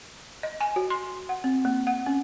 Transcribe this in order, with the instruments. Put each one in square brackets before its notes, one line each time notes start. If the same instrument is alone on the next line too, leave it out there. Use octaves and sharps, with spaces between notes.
[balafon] D#5
G#5
F#4
C6
F#5
C4
A#3
F#5
C#4